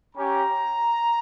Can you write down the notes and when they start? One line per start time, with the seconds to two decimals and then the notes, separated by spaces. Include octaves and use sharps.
0.15 C#4 G4 A#5